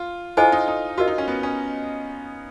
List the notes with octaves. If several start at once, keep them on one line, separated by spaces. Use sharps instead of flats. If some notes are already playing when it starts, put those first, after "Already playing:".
Already playing: F4
E4 F4 A4 C5 D#5 G#5
D#4
D#4
F4 F#4 A#4 D#5
D#4
C#4
B3
C#4